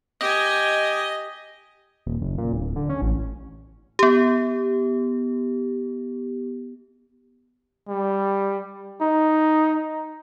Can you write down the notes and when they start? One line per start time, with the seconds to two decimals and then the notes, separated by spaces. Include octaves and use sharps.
0.21 G4 D#5 G#5
2.06 D#1
2.21 F#1
2.38 A#2
2.53 D1
2.76 D3
2.89 C#4
3.02 A1
3.99 B3 G4
7.89 G3
9.01 D#4